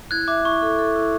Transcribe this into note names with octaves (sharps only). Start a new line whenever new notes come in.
E4 F#6 G#6
E5 D6
E4 C#6
A4
A4
E4